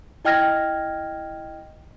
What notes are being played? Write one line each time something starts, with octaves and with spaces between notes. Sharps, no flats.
E4 D#5 G5 F6 G#6 A#6